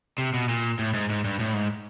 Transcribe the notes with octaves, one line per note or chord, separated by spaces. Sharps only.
C3
B2
A#2
A2
G#2
G#2
G2
A2
G#2